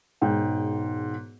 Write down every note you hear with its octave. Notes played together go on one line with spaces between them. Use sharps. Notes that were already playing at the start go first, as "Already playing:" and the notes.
E1 G#2 G5